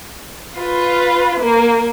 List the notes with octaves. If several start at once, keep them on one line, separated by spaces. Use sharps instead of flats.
F4 B4
A#3